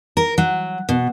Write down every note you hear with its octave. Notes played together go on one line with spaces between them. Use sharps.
A#4
F#3
B2